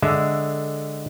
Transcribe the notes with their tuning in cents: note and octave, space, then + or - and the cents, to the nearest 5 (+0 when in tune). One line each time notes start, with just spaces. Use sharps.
D3 +0 G#3 +0 E5 +0